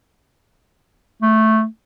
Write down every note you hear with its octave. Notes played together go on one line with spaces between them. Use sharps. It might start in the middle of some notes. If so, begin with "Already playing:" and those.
A3